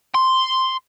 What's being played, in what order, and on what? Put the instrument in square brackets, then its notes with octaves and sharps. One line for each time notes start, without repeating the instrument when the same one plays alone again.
[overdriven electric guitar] C6